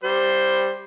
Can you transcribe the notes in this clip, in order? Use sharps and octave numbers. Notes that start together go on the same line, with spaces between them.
G3 C5